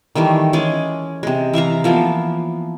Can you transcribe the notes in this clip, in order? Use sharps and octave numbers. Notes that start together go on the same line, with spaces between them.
D#3 E3 G3 A3
G#3 C#4 G#4 D6
C3 G#3
E3 E5 F5 A#5
E3 F3 A#3 B3